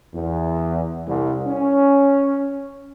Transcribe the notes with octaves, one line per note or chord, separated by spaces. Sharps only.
E2
C2
C#4